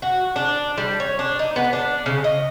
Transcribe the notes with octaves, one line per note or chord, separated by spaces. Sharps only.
F#4
D4
G3
C#5
D4
D#4
B3
D4
C#3
D#5